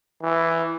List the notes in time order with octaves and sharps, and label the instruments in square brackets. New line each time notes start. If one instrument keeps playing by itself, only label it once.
[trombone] E3